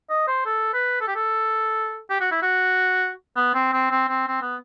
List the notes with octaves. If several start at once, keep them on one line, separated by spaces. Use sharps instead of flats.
D#5
C5
A4
B4
A4
G4
A4
G4
F#4
E4
F#4
B3
C4
C4
C4
C4
C4
B3